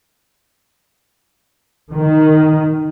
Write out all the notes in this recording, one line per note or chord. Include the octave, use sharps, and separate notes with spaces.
D#3